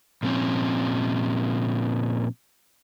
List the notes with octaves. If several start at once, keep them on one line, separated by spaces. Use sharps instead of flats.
A#2 F3 C4 C#4